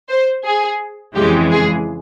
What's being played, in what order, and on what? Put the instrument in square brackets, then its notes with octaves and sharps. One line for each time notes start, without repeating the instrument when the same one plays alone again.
[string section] C5
G#4
F2 C#3 E3 G#3 G4
G#4